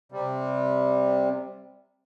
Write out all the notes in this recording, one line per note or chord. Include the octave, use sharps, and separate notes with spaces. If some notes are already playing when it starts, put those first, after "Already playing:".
C3 G3